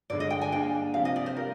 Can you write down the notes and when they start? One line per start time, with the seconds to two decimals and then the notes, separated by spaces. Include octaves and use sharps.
0.10 G2 D3 G#3 D5
0.20 D#5
0.30 G5
0.41 G#5
0.52 A#3 D4 G#4 G5
0.94 C3 F3 C4 G4 F5
1.05 D#5
1.16 D5
1.26 C5
1.37 G3 A#4